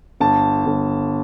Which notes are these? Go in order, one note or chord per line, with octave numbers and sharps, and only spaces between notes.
G1 A5
G1